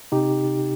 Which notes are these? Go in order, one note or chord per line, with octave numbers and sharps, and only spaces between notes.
C3 D#4 G4